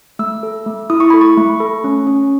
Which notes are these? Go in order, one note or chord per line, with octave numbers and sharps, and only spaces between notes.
A3 E6
A4
A3
E4 D#6
C#6
A4 B5
C#6
A3
A4
C#4
C#4